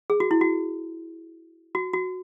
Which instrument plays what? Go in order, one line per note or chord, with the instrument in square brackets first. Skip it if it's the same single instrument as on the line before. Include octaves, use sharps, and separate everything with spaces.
[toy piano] G#4
F#4
E4
F#4
F#4
F#4